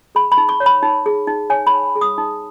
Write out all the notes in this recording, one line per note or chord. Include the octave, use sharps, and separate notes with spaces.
G#4 B5
B5
D#4
C#6
C#5
B5
D#4
G#4
D#4
C#5 G#5
B5
D#4
G#4
D#6
D#4